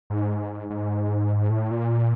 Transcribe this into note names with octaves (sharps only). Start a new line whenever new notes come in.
G#2
G#2
A2
A#2